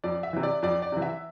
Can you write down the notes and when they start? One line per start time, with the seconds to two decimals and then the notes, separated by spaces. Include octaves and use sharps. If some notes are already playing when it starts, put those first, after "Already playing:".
0.04 F2 D5
0.23 E5
0.33 C3 E3
0.43 D5
0.62 F2 D5
0.82 D5
0.92 C3 E3
1.02 E5